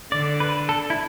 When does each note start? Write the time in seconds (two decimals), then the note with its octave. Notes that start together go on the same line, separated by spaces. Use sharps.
0.12 D3 D5
0.40 B4
0.69 A4
0.90 E4